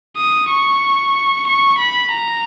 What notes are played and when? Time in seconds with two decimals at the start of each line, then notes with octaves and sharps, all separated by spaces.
0.16 D#6
0.49 C#6
1.46 C#6
1.78 B5
2.10 A#5